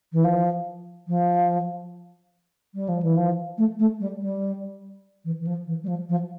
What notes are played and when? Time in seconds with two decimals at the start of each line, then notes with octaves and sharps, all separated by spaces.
0.13 E3
0.24 F3
1.08 F3
2.74 G3
2.89 F3
3.03 E3
3.17 F3
3.58 A3
3.79 A3
4.00 G3
4.21 G3
5.25 E3
5.41 E3
5.47 F3
5.67 E3
5.84 G3
5.88 F3
6.09 F3